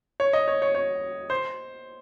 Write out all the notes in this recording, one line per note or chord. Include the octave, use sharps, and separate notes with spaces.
C#5
D#5
C#5
C#5
C#5
C5